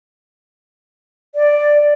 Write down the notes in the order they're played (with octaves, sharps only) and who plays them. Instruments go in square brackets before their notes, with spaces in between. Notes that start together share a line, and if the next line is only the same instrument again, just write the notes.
[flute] D5